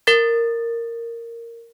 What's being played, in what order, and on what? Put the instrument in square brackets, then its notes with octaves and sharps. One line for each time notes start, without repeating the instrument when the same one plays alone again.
[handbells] A#4 A6